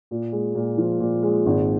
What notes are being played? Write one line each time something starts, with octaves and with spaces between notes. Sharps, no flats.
A#2
G#3
A#2
F3
A#2
G#3
G#1